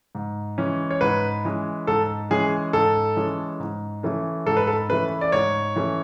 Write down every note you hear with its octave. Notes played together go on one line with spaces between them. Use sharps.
G#2
E3 G#3 C#4
C#5
G#2 B4
E3 G#3 C#4
G#2 A4
E3 G#3 C#4 G#4
G#2 A4
E3 G#3 C#4
G#2
E3 A3 C#4
G#2 A4
B4
A4
E3 A3 C#4 B4
D5
G#2 C#5
E3 A3 C#4